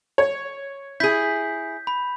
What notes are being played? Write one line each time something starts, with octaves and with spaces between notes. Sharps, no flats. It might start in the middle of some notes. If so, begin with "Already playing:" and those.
C#5
E4 G#4 G6 B6
B5